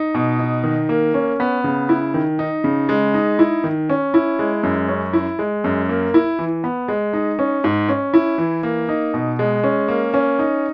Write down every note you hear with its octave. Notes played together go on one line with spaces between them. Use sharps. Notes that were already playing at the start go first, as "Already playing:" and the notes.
Already playing: D#4
B2
D#4
D#3
A#3
C#4
B3
C#3
E4
D#3
D#4
C#3
G#3
D#4
E4
D#3
C#4
E4
G#3
F#2
C#4
E4
G#3
F#2
A#3
E4
E3
B3
G#3
D#4
C#4
G#2
C#4
E4
E3
A#3
D#4
B2
G#3
C#4
A#3
C#4
D#4